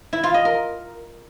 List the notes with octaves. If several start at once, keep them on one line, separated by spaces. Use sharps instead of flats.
E4
F4
D#5
A#4